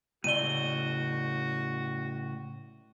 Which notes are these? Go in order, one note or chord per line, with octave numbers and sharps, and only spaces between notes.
A2 C#3 F#4 D5 D#7 G7